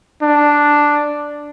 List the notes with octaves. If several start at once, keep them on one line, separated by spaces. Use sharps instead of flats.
D4